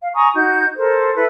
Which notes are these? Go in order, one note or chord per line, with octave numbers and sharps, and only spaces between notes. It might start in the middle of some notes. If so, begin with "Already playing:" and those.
F5
G#5 A#5 C#6 D#6
D#4 F#4 G6
A4 A#4 C5
E4 A4 B4